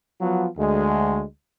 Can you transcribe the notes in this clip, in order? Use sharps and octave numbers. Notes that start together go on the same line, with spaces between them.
F3 F#3 B3 F4
D2 G#3